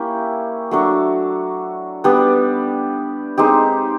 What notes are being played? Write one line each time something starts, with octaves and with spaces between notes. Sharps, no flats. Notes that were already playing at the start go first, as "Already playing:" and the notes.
Already playing: A#3 C#4 E4 G4
F#3 A3 D4 F#4
G3 B3 D4 G4
G#3 C4 D#4 G4